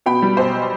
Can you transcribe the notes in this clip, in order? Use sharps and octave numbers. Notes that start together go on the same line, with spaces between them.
B2 G5 B5
G3
B1 C5